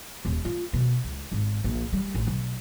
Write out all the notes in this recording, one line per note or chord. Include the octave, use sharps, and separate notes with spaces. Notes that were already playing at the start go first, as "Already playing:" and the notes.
D#1
F4
B2
C#2
G#1
A#1
G3
A1
B1